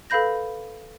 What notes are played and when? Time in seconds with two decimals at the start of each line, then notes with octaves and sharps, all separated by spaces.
0.10 A4 B4 F5 B5 G6 A#6